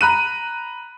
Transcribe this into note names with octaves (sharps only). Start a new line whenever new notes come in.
A#5 B5 F#6 D#7